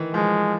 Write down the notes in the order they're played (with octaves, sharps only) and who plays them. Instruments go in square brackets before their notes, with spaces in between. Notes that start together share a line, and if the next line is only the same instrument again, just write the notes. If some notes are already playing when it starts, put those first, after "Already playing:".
Already playing: [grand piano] D#3 E3
[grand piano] F3 [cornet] G#3